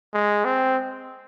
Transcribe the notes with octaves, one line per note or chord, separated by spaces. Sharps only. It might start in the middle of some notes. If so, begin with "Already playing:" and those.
G#3
C4